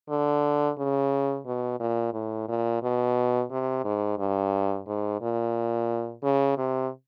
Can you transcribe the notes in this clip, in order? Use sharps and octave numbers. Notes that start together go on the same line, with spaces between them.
D3
C#3
B2
A#2
A2
A#2
B2
C3
G#2
G2
G#2
A#2
C#3
C3